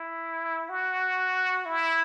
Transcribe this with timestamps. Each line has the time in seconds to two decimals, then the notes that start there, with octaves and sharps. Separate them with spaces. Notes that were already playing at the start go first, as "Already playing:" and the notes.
Already playing: E4
0.69 F#4
1.65 E4